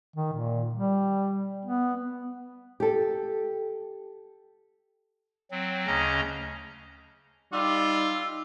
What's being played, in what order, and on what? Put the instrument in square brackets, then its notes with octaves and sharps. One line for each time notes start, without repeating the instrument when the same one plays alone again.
[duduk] D#3
A#2
G3
B3
[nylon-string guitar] G4 A4
[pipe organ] F#3 C4
D2 C#3 C#4 D#5 A#5
[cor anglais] G3 [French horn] D#4 [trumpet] F4 [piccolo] E6